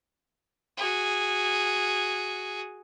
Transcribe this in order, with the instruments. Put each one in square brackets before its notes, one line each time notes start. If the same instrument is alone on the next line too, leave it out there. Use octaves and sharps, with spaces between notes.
[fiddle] F#4 G#4